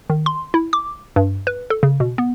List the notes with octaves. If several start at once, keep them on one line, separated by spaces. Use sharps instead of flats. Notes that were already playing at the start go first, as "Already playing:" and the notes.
D#3
C6
E4
D6
G2
B4
A4
C#3
B2
B3